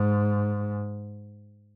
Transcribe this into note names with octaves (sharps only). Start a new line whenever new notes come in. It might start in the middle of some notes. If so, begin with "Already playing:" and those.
Already playing: G#2